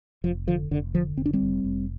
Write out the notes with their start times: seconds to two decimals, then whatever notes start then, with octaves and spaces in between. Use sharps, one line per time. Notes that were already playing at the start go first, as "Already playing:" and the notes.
0.24 F1 F3
0.47 D3 F3
0.71 F1 D3
0.94 D3 F3
1.17 F1 C4
1.26 D4
1.33 G3 C4
1.41 F1
1.64 F1